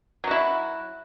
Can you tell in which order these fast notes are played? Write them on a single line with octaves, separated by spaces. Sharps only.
F#3 F#4 E4